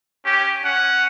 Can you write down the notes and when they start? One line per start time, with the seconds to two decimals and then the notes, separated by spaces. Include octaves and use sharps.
0.24 C#4 G4
0.63 C#4 F#5